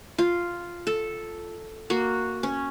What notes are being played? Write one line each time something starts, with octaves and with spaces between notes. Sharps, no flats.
F4
A4
A#3 F#4
C#4